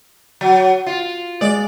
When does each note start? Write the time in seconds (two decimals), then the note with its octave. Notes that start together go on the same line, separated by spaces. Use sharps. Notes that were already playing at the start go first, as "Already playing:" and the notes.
0.41 F#3
0.87 F4
1.41 G#3 D5